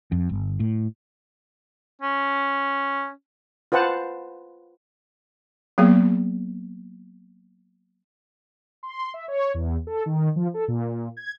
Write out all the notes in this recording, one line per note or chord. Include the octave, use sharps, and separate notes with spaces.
F2
G1
A2
C#4
F4 B4 C5 F#5 A5
F#3 A#3 B3 G#4
C6
E5
C#5
E2
A4
D#3
F3
A4
A#2
G#6